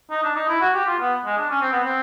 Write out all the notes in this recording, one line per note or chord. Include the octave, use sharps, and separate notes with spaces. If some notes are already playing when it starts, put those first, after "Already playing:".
D#4
D4
D#4
E4
F#4
G4
F4
B3
G#3
D4
C#4
C4
B3
C4